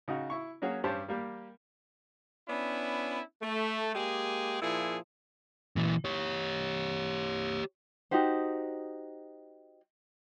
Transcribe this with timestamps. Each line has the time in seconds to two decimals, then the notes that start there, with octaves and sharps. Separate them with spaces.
0.08 C#3 D#4 F#4
0.30 E4 C#6
0.62 F#3 A#3 C#4 F#4 G#4
0.84 G2 C#4 G4 C5 A5
1.08 G3 A#3 G4
2.48 B3 C#4 D4 E4
3.42 A3
3.95 G#3 A#3 G4 G#4
4.62 A#2 F3 E4 G#4
5.76 A#2 E3
6.05 G4 C#5
8.11 D#4 F#4 G4 C5